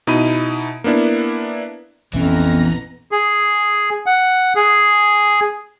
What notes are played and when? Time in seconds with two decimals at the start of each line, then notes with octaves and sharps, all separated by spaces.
0.07 B2 D#4 E4 B5 D#7
0.84 A#3 B3 D4 E4
2.13 A#1 F2 E3 B3 C#4 A#5 A#6
3.12 G#4
4.06 F#5
4.56 G#4